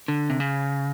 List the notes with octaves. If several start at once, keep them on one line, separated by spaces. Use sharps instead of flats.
D3
C3
C#3